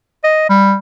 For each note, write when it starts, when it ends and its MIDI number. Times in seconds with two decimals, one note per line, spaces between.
0.24 0.49 75
0.49 0.75 55